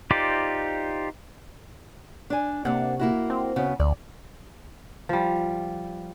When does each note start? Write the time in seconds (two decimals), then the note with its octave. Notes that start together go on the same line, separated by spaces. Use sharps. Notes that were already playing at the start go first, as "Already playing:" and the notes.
0.11 D#4 F4 G4 C5 D5
2.30 D4 G#5
2.65 C3 A#3 D4 F#5
2.99 A#3 E4 F#4
3.30 C4
3.56 C#3 B3 F#4
3.80 D2 D5
5.09 F3 G3